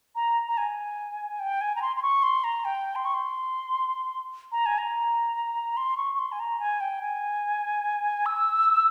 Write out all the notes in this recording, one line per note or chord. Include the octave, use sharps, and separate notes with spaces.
A#5
A#5
G#5
G5
G#5
A#5
C6
C6
C#6
C6
A#5
G5
C6
C#6
C6
A#5
G#5
A#5
C6
C#6
C#6
C6
G#5
A#5
G#5
G5
G#5
E6